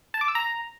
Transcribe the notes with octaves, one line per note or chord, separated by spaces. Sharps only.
A5
D6
E6
A#5